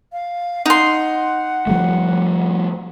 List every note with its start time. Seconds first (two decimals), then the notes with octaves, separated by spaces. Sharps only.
0.13 F5
0.66 D#4 F#5 C6
1.67 F3 G3 A3